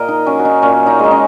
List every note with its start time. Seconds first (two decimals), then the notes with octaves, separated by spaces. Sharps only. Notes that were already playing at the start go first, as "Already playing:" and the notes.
Already playing: A#2 A#4 D#5
0.08 D#4
0.27 F#3 C#4
0.39 F#4
0.45 D#4
0.62 A#2 C#4
0.87 D#4
0.99 G#3 D#4
1.11 C#4